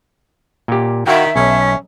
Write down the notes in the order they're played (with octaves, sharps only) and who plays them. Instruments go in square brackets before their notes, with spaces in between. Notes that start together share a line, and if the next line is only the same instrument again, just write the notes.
[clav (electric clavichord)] A#2 G4
[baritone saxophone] D#3 [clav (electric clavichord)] F#4 F5 G5 [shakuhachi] E5
[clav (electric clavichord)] B1 [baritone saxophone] C#4